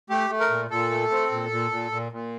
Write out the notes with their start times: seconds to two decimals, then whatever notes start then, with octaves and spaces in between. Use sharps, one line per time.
0.10 A3 G4
0.30 A3
0.40 A#4
0.50 A#2
0.71 A#2 A4
0.91 A3
1.11 C4
1.32 A#2
1.51 A#2
1.71 A#2
1.92 A#2
2.12 A#2